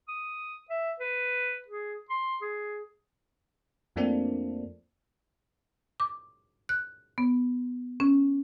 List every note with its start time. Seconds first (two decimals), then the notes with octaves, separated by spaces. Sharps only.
0.08 D#6
0.70 E5
1.00 B4
1.68 G#4
2.09 C6
2.42 G#4
3.96 F2 F3 A3 A#3 C4 D4
6.00 D6
6.69 F#6
7.18 B3
8.00 C#4